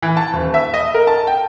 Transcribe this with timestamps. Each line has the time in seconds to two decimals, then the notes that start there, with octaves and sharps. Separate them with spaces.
0.02 E3
0.17 A5
0.33 D#1
0.54 E5
0.74 D#5
0.94 A#4
1.07 A5
1.27 G5